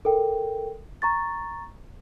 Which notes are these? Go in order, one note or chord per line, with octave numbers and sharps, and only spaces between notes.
A4 A#4 G5
A#5 C#6 A6